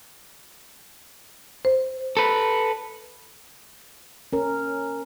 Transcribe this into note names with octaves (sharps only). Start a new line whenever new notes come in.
C5
A4 B4
C#4 A#4